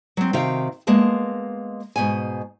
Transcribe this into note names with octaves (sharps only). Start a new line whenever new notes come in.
F#3 C4
C3 D#3 F#4 F5 G5
G#3 A#3 B3 A5
G#2 B2 G#5